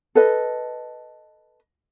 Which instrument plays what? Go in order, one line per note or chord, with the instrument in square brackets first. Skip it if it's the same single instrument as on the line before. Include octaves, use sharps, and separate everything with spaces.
[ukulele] A4 B4 D#5